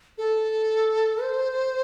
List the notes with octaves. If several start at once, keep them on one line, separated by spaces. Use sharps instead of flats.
A4
C5